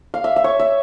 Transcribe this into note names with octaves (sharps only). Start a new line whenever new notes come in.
F5
E5
E5
C#5
E5